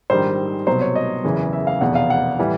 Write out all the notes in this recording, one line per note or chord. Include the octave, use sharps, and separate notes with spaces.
A#1 G#2 D#3 G3 C5
C2 B2 F#3 C5
C#5
D#5
F#1 E2 C#3 E3
E5
F5
F1 E2 B2 F#5
F5
F#5
A2 E3 G3